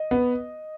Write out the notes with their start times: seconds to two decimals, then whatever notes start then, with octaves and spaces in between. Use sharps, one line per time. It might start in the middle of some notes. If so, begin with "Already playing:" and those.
Already playing: D#5
0.11 B3